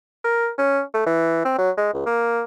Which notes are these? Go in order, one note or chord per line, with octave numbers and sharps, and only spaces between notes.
A#4
C#4
A3
E3
C4
F#3
G#3
C#2
A#3